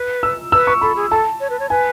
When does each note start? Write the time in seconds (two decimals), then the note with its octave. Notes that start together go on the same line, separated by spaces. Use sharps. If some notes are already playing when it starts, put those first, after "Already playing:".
Already playing: B4
0.23 E6
0.52 B4 E6
0.67 C#6
0.81 A4 B5
0.96 G#4
1.11 A4 A5
1.40 C#5
1.50 B4
1.60 C#5
1.70 B4 G#5